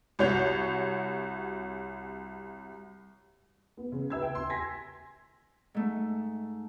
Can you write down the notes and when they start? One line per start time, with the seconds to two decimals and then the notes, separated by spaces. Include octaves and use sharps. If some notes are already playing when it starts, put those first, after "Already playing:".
0.19 C2 F#4 C#5 G6 F7
3.77 B3
3.92 C#3
4.10 B4 E5 E6 G#6
4.22 G5
4.35 C6
4.49 G#5 C6 G#6 A#6 B6
5.74 G#2 A3